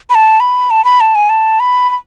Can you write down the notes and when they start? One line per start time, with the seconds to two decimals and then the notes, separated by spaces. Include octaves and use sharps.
0.10 B5
0.15 A5
0.40 B5
0.70 A5
0.85 B5
1.01 A5
1.15 G#5
1.29 A5
1.60 B5
1.90 B5